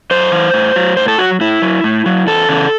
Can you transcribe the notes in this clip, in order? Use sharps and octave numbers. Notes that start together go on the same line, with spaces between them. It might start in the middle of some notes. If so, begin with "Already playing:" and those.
F#2 C5
E3
A2
F#3
A2 C5
A4
F#3 F#4
A2 E4
F#3
A2
F#3
E2 A4
C#3 E3